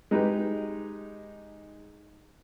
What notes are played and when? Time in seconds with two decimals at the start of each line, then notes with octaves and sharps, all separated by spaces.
0.11 G#3 D#4 G4 B4